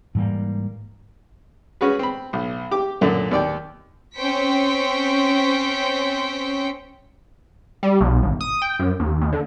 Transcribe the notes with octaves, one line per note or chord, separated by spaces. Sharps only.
G#2 E3 G3 A#3
C#4 F#4 G#4 B4
C4 B5
B1
G4 D6
F#2 A#2 D3
D#2 D5 G5
C4 C#4 C5 G5 B6 C#7
G3
B1
G#1
D#6
G5
F#2
D#2
D#2
D3